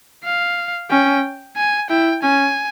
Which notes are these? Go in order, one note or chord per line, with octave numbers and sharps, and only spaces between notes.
F5
C#4 G5
G#5
E4 G5
C#4 G#5